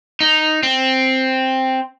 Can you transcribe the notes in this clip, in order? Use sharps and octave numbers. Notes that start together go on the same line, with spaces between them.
D#4
C4